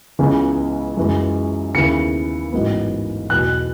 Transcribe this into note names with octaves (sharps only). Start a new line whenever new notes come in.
C#2 C#3 E3 B3
F#2 E3 G#3
D#2 C#3 E3 B3 E4 C#7
A1 G#2 F#3 B3
E2 B2 F#3 F#6